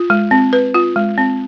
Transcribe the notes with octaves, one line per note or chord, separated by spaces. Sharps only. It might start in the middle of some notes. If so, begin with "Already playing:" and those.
Already playing: F4
G#3
C4
B4
F4
G#3
C4